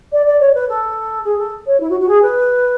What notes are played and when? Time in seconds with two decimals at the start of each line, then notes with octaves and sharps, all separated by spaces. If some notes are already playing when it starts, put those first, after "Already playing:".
0.12 D5
0.26 D5
0.40 C#5
0.54 B4
0.69 A4
1.24 G#4
1.38 A4
1.67 C#5
1.80 E4
1.90 F#4
2.00 F#4
2.08 G#4
2.22 B4